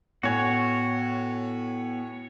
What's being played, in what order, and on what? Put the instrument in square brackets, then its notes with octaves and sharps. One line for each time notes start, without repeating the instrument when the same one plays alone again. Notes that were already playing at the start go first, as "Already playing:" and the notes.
[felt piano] A2 G#5 [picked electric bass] B3 [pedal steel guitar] F#4 C#5